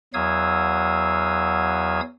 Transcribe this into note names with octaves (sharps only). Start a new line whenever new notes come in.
E2 F#3 F5 D#6 E6 G#6